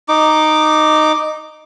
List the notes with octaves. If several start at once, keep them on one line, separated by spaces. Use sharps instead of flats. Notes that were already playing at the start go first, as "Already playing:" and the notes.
D#4 D6